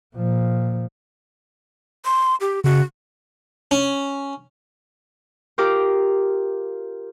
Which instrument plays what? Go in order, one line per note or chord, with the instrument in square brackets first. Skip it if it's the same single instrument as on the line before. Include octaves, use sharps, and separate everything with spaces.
[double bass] A#2 F3
[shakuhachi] C6
G4
[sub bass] C#3 [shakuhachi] F#4
[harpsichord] C#4
[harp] F4 G4 A#4 D6